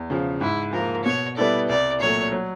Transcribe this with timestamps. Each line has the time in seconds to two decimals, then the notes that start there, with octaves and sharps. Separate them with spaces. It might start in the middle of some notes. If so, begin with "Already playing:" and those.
Already playing: E2
0.10 C#3 F3
0.41 G#2 E4
0.73 F3 A#3 A#4
1.04 B2 C#5
1.37 G3 B3 E4 A4 D5
1.69 C2 D5
2.00 A#2 F#3 A3 C#5
2.32 F#3